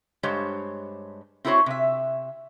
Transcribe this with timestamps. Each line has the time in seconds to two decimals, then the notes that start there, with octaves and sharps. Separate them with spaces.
0.23 G2 G#3 G4 C5 C#5
1.45 C4 E4 F#4 G#4 C5 C#5
1.66 C3 E5